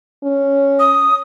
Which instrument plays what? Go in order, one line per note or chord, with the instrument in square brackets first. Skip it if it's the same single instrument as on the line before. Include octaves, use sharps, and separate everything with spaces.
[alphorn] C#4
[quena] D#6